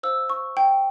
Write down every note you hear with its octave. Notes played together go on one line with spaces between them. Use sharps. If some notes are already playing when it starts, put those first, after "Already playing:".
C5 F5 E6
C#6
G5